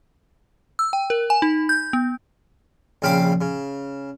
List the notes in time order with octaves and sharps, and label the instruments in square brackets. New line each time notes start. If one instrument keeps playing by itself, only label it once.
[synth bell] E6
G5
A#4
G#5
D#4
G6
B3
[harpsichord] A#1 C#3 F5 G5 B5 D6
C#3